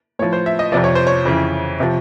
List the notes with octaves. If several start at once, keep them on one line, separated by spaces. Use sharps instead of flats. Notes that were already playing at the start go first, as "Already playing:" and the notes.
A2 F3 C#5
C5
E5
D#5
F2 C3 F3 D5
C#5
C5
C#5
F2 C#3 E3
C3 F3